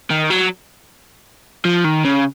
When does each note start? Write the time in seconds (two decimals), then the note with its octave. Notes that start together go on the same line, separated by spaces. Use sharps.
0.10 D#3
0.30 F#3
1.65 F3
1.84 D#3
2.04 C#3